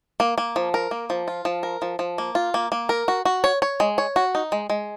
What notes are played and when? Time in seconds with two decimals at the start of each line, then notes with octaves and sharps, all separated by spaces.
0.20 A#3
0.38 A#3
0.56 F3
0.74 A#4
0.91 A#3
1.10 F3
1.28 F4
1.45 F3
1.63 A#4
1.82 F3
1.99 F3
2.18 A#3
2.35 F4
2.54 A#3
2.72 A#3
2.89 A#4
3.08 F#4
3.25 F#4
3.44 C#5
3.62 C#5
3.80 G#3
3.98 C#5
4.16 F#4
4.35 D#4
4.52 G#3
4.70 G#3